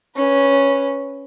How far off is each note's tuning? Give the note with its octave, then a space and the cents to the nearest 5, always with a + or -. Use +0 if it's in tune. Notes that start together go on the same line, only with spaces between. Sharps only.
C#4 +0 B4 +0